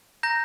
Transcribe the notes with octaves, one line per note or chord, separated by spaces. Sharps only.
A#5 G6 A#6